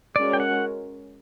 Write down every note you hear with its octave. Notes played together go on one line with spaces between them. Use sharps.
G#3 C#4 F#4 A#4 D5
G5
F#5